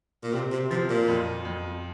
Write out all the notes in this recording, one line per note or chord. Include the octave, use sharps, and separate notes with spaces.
A#2
C3 C4
C3
C3 F3
A#2
F2
F2